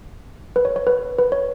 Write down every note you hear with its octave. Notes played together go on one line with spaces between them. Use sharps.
B4
C#5
C#5
B4
B4
C#5